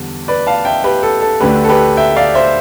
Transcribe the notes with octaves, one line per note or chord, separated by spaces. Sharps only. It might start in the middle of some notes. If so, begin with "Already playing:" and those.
Already playing: E2 D3 G3
B4 D5
F5 A5
E5 G5
G4 B4
A4
A4
D2 D3 A3 D4 G4 B4
A4
G4 B4
E5 G5
D5 F5
C5 E5